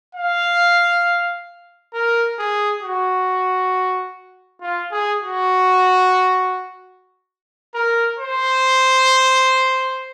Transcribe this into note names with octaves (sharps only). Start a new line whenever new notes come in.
F5
A#4
G#4
F#4
F4
G#4
F#4
A#4
C5